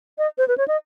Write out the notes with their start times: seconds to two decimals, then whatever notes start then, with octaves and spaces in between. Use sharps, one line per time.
0.18 D#5
0.38 C5
0.48 B4
0.58 C#5
0.68 D#5